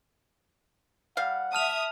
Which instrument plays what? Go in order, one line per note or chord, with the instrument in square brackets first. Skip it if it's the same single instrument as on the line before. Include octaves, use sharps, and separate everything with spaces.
[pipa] G3 F5 [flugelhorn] F#5
[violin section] E5 D#6 [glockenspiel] A5 F6 F7